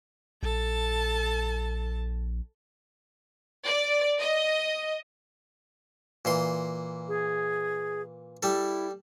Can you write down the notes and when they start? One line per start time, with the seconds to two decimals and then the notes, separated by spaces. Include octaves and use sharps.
0.43 A#1 A4 A5
3.65 D5
4.19 D#5
6.25 A#2 E3 C6
7.08 G#4
8.43 G3 E4 A4